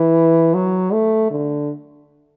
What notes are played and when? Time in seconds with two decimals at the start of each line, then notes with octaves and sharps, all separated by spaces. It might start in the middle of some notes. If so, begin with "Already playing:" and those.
Already playing: E3
0.54 F#3
0.93 A3
1.31 D3